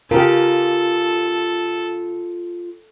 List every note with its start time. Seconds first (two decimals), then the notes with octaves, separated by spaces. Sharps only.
0.11 C#3 F4 G4 A4 A#4